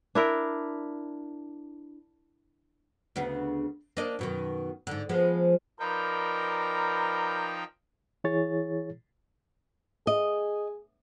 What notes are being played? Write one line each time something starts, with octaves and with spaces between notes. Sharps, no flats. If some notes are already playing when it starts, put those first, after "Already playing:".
D4 E4 A#4
D2 C#3 B3
A#3 D4 D#5
F#2 B2 D#3
G#2 D3
F3 G#3 B3
F3 D#4 A#4 B4 D5 G5
E3 E4 G#4 C#5 A6
G#4 D#5